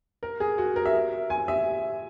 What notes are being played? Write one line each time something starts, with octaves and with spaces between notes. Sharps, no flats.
A#4
G#4
F#4
A#4
E5
G#5
E5